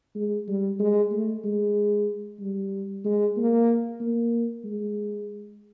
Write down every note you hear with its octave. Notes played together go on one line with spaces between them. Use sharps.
G#3
G3
G#3
A3
G#3
G3
G#3
A#3
A#3
G#3